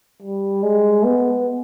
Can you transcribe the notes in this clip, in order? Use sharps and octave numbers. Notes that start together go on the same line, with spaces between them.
G3
G#3
B3